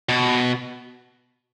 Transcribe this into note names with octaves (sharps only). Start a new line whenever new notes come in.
B2